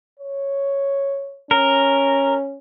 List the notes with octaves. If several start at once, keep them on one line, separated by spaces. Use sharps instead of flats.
C#5
C#4 A#4